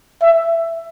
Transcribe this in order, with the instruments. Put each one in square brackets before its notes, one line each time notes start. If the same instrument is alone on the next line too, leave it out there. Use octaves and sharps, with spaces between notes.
[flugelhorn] E5